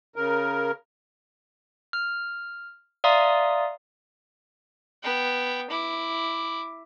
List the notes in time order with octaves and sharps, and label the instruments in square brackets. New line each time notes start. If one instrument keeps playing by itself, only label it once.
[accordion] C#3 A#4
[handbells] F6
D5 E5 F5 A#5 C6 D#6
[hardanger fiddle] B3 G5
E4 D6